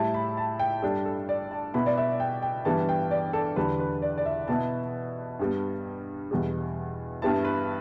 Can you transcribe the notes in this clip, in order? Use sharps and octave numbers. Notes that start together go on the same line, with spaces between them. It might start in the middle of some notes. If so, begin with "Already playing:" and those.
Already playing: A2 G3 E4 A5
B5
A5
G5
G2 G3 D4 A4
A4
D5
A5
B2 B3 E4 B5
D5
E5
G5
G5
G2 E3 G3 B3 A5
G5
D5
A4
E2 D3 G3 D4 B4
B4
D5
D5
E5
B2 B3 E4 A5
G2 G3 B3
E2 B2 G3
G2 G3 B3 E4 A5
B4